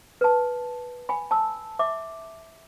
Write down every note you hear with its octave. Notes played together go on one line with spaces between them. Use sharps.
B4 A5
G#5 B5
A5 E6
E5 D6